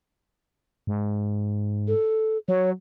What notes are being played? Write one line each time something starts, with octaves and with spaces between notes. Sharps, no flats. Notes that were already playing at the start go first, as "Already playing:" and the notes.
G#2
A4
F#3 C#5